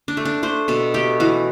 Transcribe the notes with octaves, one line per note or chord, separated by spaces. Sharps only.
D4
A3
D4
A3 C5
B2 A4
A3 G4
E3 F#4